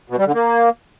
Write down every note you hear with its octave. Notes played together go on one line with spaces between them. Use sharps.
B2
G3
D3
A#3